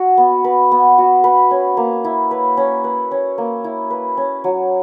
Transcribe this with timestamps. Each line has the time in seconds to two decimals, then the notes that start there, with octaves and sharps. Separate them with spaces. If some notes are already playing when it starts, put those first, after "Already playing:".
Already playing: F#4
0.17 B3
0.44 B4
0.72 B3
0.98 F#4
1.24 B4
1.51 C#4
1.77 A#3
2.04 E4
2.31 B4
2.57 C#4
2.84 B4
3.11 C#4
3.38 A#3
3.64 E4
3.90 B4
4.17 C#4
4.44 F#3